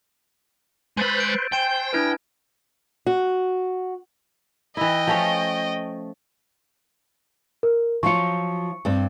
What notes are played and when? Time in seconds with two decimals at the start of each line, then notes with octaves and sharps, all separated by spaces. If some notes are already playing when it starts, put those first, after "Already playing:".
0.97 G#3 B4 C5 B5 E6 A6 D#7
1.17 G6 D7
1.52 C5 G5 G#5 D7 E7
1.93 D4 E4 B4 G#5 F6 G#6
3.07 F#4
4.77 E3 E4 D#5 G5
5.07 F3 A3 C#4
7.63 A#4
8.03 F3 F#3 F4 C#6 C#7
8.85 G2 C4